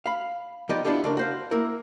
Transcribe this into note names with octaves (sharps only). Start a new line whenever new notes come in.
F5 B5
F3 G3 B3 D#4 G4 D#5
B3 D4 E4 F4 G4 A4
C#2 D4 A#4
F#4 C5 F5
A#3 E4 A#4